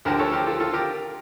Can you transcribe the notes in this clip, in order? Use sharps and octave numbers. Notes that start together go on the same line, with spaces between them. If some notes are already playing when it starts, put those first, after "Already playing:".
D2 D3 F3 G4 A#4
A4 C#5
G4 A#4
F4 A4
F4 A4
G4 A#4